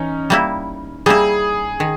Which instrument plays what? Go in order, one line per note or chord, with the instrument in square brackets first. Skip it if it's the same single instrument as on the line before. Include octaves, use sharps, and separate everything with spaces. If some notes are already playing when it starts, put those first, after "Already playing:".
Already playing: [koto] E3 [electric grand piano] C#4 D#4
[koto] G3 A#3 E4
[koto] G3 A#3 E4 [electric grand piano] G#4
[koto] D#3